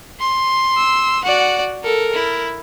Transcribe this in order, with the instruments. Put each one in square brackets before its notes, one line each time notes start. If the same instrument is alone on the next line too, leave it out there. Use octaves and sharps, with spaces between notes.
[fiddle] C6
[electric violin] E6
[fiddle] F#4 [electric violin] D5 F#5
[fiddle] A4 [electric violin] A#4
[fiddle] E4